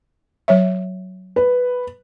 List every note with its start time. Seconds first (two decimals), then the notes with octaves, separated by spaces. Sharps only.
0.48 F#3 C#5 E5
1.36 B4